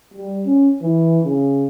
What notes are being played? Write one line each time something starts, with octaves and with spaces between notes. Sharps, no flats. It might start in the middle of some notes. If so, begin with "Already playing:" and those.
G3
C#4
E3
C#3